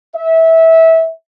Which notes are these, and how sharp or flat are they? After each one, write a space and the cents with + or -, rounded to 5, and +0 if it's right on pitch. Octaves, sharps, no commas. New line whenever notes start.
E5 -20